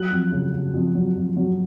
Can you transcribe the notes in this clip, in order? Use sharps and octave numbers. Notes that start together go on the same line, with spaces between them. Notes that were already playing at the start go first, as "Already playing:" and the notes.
Already playing: F#3 F#6
F2
C#3
C#3
F2
F#3
F2
F#3